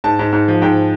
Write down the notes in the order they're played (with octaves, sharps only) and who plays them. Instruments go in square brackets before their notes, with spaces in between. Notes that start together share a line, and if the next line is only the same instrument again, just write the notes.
[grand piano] G#2 A5
G#2
G#2
F3
G#2 G5